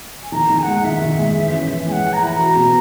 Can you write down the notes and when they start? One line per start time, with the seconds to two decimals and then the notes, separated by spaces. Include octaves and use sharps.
0.23 G#5
0.32 D#3 A#5
0.50 D#3
0.58 G#5
0.63 G#3 F#5
0.84 D#3 E5
1.01 D#3
1.19 G#3
1.35 E3
1.53 C#4
1.70 E3
1.87 G#3 G#5
1.92 F#5
2.04 E3
2.12 A#5
2.22 E3 B5
2.33 A#5
2.39 F#4
2.56 B2